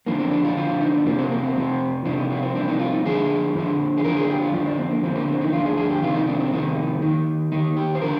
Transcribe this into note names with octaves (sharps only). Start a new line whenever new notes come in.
F2 D3 F3 A#3
C4
D4
F4
F2 D3 F3 F4
F4
D#4
D4
F2 C3 F3 A#3
C4
A#3
C4
F2 C3 F3
C2 C3 F3 D4
D#4
F4
C4
C2 C3 F3 D4
D#4
F4
D#4
F2 D3 F3 G#4
F2 D3 F3
G#4
F2 D3 F3 A#4
G#4
G4
F4
F2 D3 F3 D4
D4
C4
A#3
D2 D3 F3 C4
A#3
C4
D#4
D2 D3 F3 F4
G#4
G#4
G4
F2 C3 D#3 F4
D#4
D4
C4
F2 C3 D#3 D#4
D#2 D#3
D#2 D#3 D#4
G4
C5
D3 F3 A#4